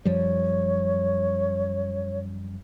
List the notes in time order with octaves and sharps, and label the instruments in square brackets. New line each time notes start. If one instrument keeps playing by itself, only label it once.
[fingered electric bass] F#2 F3 G3 [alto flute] C#5